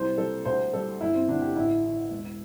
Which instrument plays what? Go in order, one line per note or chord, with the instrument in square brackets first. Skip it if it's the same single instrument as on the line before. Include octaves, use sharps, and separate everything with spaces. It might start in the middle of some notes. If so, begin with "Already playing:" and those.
Already playing: [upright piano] C2 G3 C5
G3 A4
D2 C5
G3 A4
G1 E4
C4
D3 D4
G4
A1 E4
E3
E1